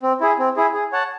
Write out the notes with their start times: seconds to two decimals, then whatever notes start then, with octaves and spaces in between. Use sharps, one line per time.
0.03 C4
0.21 E4 G#4
0.39 C4
0.56 E4 G#4
0.74 G#4
0.92 C#5 F#5 A5